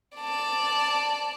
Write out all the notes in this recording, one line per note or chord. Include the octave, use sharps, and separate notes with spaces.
D5 A5